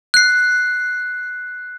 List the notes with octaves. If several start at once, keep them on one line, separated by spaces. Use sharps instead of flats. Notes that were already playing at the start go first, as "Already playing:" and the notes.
F#6 C7